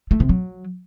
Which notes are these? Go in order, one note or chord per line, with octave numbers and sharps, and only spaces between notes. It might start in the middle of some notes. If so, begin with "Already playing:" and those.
A3
C3
F#3